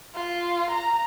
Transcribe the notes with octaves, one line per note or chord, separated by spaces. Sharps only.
F4
A#5